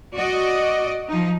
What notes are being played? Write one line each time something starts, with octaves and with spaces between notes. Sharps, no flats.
F#4 D5 D#5
F3 D#4